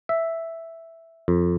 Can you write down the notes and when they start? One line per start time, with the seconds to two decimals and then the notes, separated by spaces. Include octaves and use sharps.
0.09 E5
1.28 F2